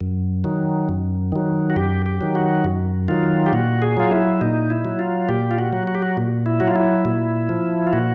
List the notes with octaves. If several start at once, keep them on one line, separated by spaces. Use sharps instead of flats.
F#2
D#3 F#3
F#2
D#3 F#3
F#4
F#2 G4
G4
D#3 F#3
F#4
F#2
D#3 F#3 F4
G4
A#2 F#4
G#4
F#3 F4
E4
A#2 D#4
E4
F#3
F4
A#2 G4
F4
F#4
F#3
F#4
G4
F#4
A#2
E4
F#3 F#4
F4
E4
A#2
F3
F4
A#2 F#4